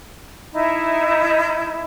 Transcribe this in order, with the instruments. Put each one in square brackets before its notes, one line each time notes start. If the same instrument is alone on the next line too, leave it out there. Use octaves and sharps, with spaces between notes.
[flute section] D#4 E4